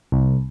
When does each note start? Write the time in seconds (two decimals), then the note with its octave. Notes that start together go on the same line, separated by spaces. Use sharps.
0.12 C2